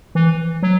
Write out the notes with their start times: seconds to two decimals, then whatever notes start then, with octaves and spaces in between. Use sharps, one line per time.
0.15 E3
0.63 F#3